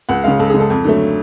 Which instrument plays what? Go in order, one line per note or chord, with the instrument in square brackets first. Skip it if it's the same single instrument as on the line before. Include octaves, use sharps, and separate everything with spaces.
[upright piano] C#2 F#5
C#3 G#3 F5
C#2 A4
C#3 G#3 G#4
A4
F2
D3 F#3 A3